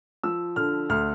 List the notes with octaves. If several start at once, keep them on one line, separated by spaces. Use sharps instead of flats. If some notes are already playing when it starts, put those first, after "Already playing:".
F3 E6
D3 F6
D2 F6